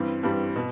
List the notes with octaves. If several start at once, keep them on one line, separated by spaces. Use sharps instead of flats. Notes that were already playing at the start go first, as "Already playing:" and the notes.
Already playing: G2 E3 G3 C4
G2 E3 G3 C4
B2